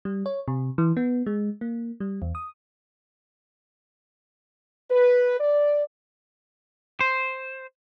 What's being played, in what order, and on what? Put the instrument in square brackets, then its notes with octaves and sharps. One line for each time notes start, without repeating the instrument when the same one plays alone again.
[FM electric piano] G3
C#5
C3
E3
B3
G#3
A#3
G3
E2
D#6
[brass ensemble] B4
D5
[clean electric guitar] C5